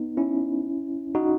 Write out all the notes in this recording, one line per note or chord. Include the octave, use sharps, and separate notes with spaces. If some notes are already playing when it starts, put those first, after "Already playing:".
Already playing: B3 D#4
C#4 E4
D#4 F#4